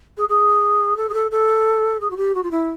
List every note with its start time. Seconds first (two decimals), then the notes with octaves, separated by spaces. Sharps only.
0.17 G#4
0.28 G#4
0.96 A4
1.09 G#4
1.13 A4
1.31 A4
2.00 G#4
2.10 F#4
2.16 G4
2.34 F#4
2.43 F4
2.51 E4